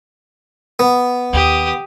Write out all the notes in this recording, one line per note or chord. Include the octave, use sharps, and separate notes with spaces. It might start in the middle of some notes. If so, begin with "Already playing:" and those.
B3
D#2 G4 D#6